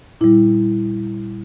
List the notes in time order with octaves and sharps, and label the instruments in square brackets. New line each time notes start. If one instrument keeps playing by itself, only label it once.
[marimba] A#2 G3 E4